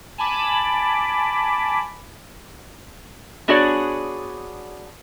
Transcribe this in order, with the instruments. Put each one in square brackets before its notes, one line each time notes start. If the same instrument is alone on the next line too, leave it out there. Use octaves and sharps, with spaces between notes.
[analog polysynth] G#5 A5 B5 D6
[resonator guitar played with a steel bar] B3 D4 F#4 G#4 C#5 D5